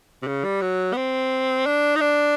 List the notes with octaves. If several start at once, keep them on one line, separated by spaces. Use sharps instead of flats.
C3
C#3
G3
F#3
B3
C4
D4
D#4
D4